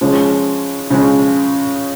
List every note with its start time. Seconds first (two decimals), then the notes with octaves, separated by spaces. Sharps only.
0.01 C#3 F3 G#3 C#4
0.90 C#3 F3 G#3 C#4